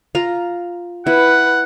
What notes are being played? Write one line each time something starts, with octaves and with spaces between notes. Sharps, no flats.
F4 A#5
E4 B4 F#5